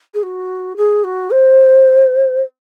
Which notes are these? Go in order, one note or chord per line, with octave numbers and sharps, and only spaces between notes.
G#4
F#4
G#4
F#4
C5